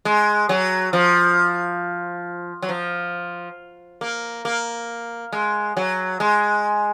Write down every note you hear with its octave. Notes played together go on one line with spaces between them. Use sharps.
G#3
F#3
F3
F#3
F3
A#3
A#3
G#3
F#3
G#3